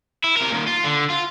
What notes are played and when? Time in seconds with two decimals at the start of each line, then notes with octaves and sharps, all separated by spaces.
0.24 E4
0.37 C3 A#4
0.50 A#2 D#3
0.67 F4
0.84 D3
1.10 F4